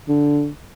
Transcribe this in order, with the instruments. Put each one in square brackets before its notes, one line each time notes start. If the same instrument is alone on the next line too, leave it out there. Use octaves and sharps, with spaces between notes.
[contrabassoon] D3